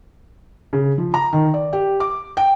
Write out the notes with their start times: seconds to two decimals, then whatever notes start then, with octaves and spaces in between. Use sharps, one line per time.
0.73 C#3
0.98 F3
1.14 A#5
1.33 D#3
1.54 D5
1.73 G4
2.00 D6
2.37 G5